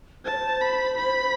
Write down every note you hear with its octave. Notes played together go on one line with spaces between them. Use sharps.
C5 A5
C#5
C5
B5
B5